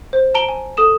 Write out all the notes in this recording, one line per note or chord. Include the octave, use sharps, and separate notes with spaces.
C5
A5 A#5 D7 G7
G#5
A4 D#6 E7